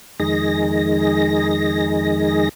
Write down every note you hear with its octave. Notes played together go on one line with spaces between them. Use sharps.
F2 D#3 G#3 D#4 G#4 A#6